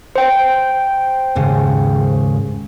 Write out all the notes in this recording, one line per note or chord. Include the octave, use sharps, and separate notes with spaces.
C5 G5
D#2 G#2 C#3